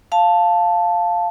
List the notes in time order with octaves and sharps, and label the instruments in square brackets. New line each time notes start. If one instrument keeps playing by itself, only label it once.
[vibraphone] F5 A5